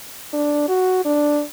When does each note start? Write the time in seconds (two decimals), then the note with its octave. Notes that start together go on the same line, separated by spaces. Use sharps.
0.33 D4
0.68 F#4
1.05 D4